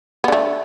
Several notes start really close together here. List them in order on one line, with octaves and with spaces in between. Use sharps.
B3 D3 A3